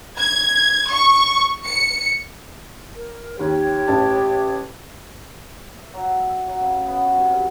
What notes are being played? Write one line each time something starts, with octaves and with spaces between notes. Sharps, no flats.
G#6
C#6
C#7
A#4
D#2 G4 C#5
A1 A5
E5
F#3
E5
F#3
C#3
B3
F#4
C3
F#2